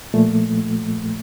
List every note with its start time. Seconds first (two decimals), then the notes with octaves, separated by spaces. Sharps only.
0.14 A#2 F3 A3